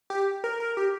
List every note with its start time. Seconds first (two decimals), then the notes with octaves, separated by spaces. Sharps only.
0.10 G4
0.44 A#4
0.60 A#4
0.77 G4